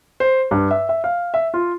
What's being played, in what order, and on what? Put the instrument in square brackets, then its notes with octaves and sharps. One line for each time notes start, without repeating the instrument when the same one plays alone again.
[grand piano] C5
G2
E5
E5
F5
E5
F4